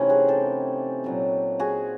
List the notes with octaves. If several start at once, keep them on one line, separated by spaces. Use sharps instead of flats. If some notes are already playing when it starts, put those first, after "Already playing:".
Already playing: C3 E3 A3 C4 C#4 D#4
F#4 G#4
G4 A4
A#2 F#3 A3 C4
F#4 G#4